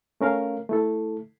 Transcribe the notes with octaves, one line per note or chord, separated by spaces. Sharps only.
A3 C#4 A#4 F5
A3 E4 A4